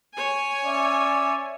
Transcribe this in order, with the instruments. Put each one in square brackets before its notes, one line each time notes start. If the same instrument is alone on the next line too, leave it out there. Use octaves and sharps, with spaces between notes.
[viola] C#5 G#5
[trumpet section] C#4 D5 E5